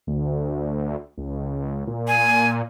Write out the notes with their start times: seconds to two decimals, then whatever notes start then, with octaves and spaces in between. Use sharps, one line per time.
0.07 D2
1.18 C#2
1.87 A#2
2.08 G#5